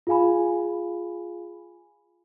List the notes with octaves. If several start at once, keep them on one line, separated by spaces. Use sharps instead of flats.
F4 G#4 F5 G#5 B5